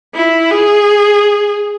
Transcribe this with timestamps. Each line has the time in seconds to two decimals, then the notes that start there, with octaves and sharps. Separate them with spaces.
0.14 E4
0.51 G#4